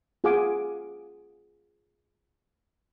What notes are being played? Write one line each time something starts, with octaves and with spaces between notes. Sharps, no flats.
F4 G#4 F5 F#5 G#5 D6